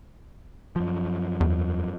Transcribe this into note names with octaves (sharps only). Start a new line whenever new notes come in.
F#2 F3
E2